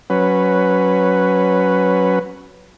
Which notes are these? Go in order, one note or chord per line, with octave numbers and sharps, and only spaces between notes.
F#3 C#4 B4